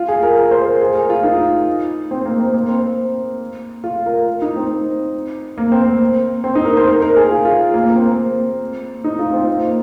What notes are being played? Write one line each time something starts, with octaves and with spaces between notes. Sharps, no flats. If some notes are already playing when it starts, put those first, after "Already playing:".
Already playing: F4
G#4
A#4
A#4
C5
A#4
G#4
A#4
F4
D#4
C4
A#3
C4
A#3
C4
F4
A#4
D#4
C4
A#3
C4
A#3
C4
D#4
A#4
C5
A#4
A#4
G#4
F4
F4
A#3
A#3
C4
D#4
F4
C4
A#3